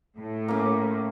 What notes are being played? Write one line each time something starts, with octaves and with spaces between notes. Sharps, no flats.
A2
A#3 C#4